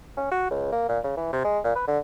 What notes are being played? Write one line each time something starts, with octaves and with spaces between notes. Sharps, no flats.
C#4
F#4
C#2
A#3
A#2
C#3
E3
C3
G#3
A#2
B4
D3